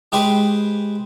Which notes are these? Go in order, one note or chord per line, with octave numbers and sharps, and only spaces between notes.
G#3 G4 G#4 B4 C5